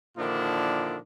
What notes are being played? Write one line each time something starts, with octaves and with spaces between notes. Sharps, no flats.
A#2 D3 D#3 F3 D4 E4